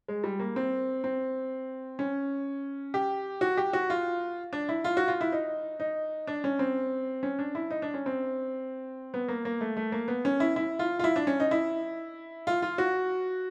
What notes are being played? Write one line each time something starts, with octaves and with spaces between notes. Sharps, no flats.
G#3
G3
A#3
C4
C4
C#4
G4
F#4
G4
F#4
F4
D4
E4
F4
F#4
F4
E4
D#4
D#4
D4
C#4
C4
C#4
D4
E4
D#4
D4
C#4
C4
B3
A#3
A#3
A3
A3
A#3
B3
C#4
E4
E4
F4
F4
E4
D4
C#4
D#4
E4
F4
F4
F#4